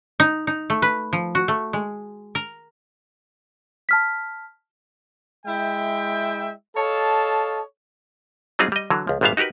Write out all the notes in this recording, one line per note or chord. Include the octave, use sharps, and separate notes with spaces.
D#4
D#4
A3
B4
F3
F#4
A3
G#3
A#4
A5 F6 B6
G#3 E4 E5 G5
A4 C#5 D#5 F5 A5
F#3 G3 C4 D#4 F4 G#4
G3 D#5
D3 E3 F#3
C#2 F3
G#1 A#2 G3 B3 E5 F5
D#4 F#4 G4 A#4 B4